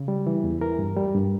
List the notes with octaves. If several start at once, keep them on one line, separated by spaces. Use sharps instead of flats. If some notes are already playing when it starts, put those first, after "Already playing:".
Already playing: C#3
G3
E3
E2
E3 A#4
G2
G3
G2